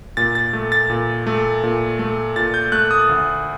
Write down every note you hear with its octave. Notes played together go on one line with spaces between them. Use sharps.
A#2 A6
A6
A3
A6
A#2
A3
A#2
A3
A#2 A6
G6
A3 F#6
D#6
D2